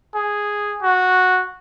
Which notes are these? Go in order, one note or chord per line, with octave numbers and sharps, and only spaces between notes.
G#4
F#4